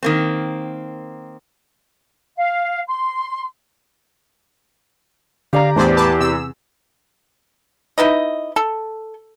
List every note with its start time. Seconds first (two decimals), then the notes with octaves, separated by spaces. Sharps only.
0.03 D#3 A#3 C4
2.37 F5
2.87 C6
5.53 D3 G4 D5 F5 A#5
5.76 E2 A2 E3 D4 G4 C5 D5
5.96 B4 A5 D6
6.20 C3 E6
7.98 D#4 E4 B4 D#5
8.56 A4